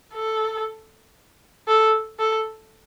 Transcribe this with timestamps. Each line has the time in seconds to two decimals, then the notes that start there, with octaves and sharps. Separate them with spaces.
0.14 A4
1.68 A4
2.19 A4